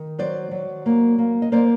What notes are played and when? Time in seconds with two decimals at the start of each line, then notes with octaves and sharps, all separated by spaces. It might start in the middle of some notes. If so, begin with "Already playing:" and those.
Already playing: D#3
0.19 F#3 C5 D5
0.51 F#3
0.86 A#3
1.18 A#3
1.42 D#5
1.52 A#3 C5 D5